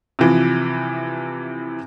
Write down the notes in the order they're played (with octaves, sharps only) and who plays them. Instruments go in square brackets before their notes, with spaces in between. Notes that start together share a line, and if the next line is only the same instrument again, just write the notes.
[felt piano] C3 E3 F3